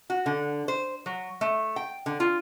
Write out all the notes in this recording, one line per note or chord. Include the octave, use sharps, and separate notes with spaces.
F#4
D3
C5
F#3
A3
G5
D3
F4